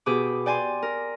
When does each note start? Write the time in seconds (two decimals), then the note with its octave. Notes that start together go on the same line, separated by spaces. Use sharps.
0.06 B2 G4 G#4 B5 D6
0.46 D5 G5 G#5 C6
0.82 A#4